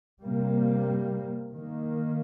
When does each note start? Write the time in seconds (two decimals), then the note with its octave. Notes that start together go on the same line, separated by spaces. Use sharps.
0.21 C3 G3 A#3
1.52 D#3 A#3